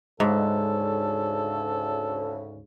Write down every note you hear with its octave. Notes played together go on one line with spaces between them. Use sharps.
D2 G#2 C#3 A4